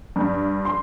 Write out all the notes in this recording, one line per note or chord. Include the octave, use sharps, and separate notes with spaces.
G2
C6